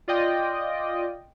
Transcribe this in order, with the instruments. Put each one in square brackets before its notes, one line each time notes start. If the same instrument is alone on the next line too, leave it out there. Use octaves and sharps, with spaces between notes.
[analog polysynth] F4 D5 D#5 G5